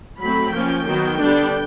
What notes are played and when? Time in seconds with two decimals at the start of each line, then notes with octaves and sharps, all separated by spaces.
0.20 F#3 A3 C4 B5
0.53 F3 A#3 C#4 G5
0.87 D#3 F#3 B3
1.20 D3 G3 B3 D4